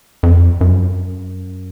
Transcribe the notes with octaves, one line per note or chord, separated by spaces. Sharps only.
F2
F#2